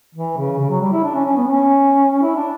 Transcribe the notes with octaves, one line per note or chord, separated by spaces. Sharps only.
E3
C#3
C#3
F#3
G3
E4
D4
C#4
C#4
B3
C#4
E4
D4